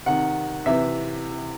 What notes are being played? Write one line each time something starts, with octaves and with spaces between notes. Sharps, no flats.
C3 D#3 F#5
C3 E3 E5